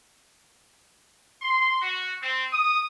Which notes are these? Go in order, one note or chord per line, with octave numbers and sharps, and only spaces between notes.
C6
F#4
C4
D#6